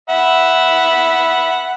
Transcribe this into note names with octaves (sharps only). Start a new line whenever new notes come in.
E5 F#5 B5